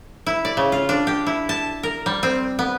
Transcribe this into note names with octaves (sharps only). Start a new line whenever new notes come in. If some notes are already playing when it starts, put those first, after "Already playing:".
E4
D5
C#3
F4
D4
G4
E4
A5
A#4
G3
C4
B3